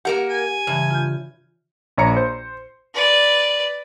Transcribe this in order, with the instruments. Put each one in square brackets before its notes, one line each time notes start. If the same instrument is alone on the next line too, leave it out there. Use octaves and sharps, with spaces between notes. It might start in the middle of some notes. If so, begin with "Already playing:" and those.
[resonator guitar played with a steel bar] A#3 A#4 F#5 [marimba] G4
[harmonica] G#5
[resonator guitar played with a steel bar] G2 [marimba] C#3 E3
[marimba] F4 G6
[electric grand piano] A#1 C#5 A#5 C#7
C5
[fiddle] B4 D5